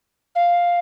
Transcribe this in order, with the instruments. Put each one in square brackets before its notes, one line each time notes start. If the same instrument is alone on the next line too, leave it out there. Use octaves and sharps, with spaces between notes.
[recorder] F5